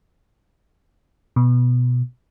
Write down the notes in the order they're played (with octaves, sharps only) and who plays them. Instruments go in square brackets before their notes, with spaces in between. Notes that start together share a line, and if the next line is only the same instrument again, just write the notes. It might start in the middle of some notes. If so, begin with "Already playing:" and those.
[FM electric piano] B2